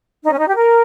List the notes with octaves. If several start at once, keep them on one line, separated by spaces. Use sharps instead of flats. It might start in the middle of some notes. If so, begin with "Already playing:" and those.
D#4
C#4
D#4
G4
A#4